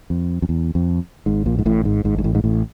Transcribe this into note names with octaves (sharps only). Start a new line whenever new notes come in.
F2
F2
E2
F2
G#1 G#2
A#1 A#2
G#2
A1 A2
G#1 G#2
G#1 G#2
G#2
A1 A2
G#2
A1 A2